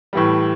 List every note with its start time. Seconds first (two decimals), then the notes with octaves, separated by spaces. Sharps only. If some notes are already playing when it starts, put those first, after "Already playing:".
0.13 A2 E3 G3